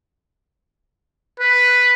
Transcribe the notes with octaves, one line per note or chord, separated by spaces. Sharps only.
B4